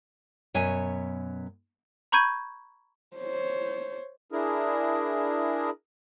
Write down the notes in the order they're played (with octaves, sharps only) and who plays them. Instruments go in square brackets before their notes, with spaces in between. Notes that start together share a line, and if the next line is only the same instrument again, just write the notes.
[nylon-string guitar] F#2 B2 C#5 G#5
[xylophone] A#5 B5 C#6 G6 G#6 D#7
[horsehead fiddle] C5 C#5
[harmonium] D4 E4 G#4 A#4